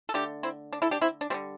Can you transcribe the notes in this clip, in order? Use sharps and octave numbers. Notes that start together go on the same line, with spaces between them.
A4
D3 A3 D4 G4
C4 E4
D4
E4 A4
D4 G4
C4 E4
D4
D3 G3 C4